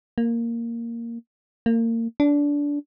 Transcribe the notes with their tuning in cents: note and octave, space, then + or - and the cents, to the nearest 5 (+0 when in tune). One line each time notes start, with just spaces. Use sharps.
A#3 -5
A#3 -30
D4 -20